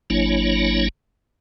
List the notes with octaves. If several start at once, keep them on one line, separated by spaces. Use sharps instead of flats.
G#1 F#3 A#3 D4 E4 C#5